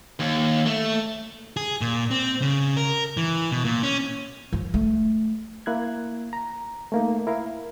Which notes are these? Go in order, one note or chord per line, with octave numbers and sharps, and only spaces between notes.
D#2
A3
G#4
A#2
C4
C#3
A#4
E3
B2
A#2
C#4
F3
A3
A#3 E4 F#6 G#6
A#5
A3 A#3 D#4
E4 A#4 F5